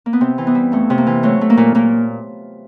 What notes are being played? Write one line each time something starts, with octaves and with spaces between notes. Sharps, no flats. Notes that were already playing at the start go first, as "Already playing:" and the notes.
A#3
B3
C3 C4
E3
B3
G3
F2 A3
C3
A#3
E3
F#3 A3
A3
A#3
A#2
A#2 A#3